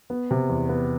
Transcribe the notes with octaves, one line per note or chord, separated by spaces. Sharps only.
B3
C3
E2
B3